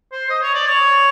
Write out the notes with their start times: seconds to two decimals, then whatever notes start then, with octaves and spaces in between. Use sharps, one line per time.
0.12 C5
0.30 D#5
0.43 C#5
0.54 D5
0.67 C#5